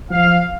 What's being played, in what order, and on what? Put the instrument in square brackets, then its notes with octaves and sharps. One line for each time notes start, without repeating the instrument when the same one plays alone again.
[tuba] F3 [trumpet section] F5